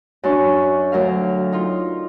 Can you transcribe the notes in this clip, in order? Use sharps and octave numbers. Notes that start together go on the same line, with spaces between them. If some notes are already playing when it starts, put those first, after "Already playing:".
F#2 D4 C#6
D2 F#3 A#4 F5
D#4 F4